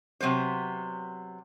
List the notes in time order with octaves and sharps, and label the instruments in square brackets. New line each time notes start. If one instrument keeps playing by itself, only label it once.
[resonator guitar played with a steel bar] C3 F#3 B3 C5